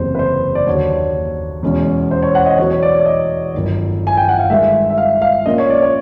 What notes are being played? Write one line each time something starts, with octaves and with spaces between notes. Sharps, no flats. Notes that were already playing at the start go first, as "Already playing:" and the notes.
Already playing: F#1 E2 C3 C5
B4
C5
D5
D#2 D3 F#3 C#5
E2 B2 G#3 C#4
C5
C#5
F#5
D#5
E2 B2 F#3 B3 C#5
C#5
D5
D5
D#5
G1 F#2 D#3
G#5
G5
F#5
F5
G2 D#3 G#3 E5
E5
F5
F5
A#2 F3 A#3 C#4 F4 D#5
C#5
D5
C#5